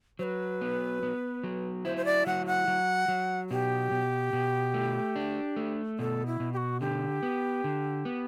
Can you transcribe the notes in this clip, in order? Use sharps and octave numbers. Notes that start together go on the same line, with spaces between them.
F#3 B4 C5
B3
B3
F#3
E4 C5
C5
D5
F#3 F#5
F#5
F#3
F#3
B2 G4
B2
B2
A3
D4
A3
B2 A4
E4
B2
G4
F#4
D3 G4
B3
D3
B3